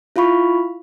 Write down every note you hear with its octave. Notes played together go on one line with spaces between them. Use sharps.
E4 F4 F5 B5 C#6